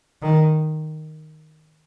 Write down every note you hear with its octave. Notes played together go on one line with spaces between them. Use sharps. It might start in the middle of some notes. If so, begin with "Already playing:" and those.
D#3